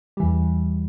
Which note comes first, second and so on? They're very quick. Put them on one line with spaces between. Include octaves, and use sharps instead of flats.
G3 E3 E2